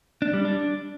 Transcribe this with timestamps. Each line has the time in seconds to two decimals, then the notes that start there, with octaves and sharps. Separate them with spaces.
0.22 D4
0.33 G3
0.45 D4